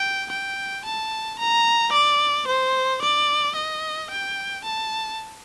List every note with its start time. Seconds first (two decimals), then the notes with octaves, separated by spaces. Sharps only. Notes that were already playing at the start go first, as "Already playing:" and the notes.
Already playing: G5
0.31 G5
0.85 A5
1.39 A#5
1.93 D5
2.47 C5
3.02 D5
3.56 D#5
4.10 G5
4.64 A5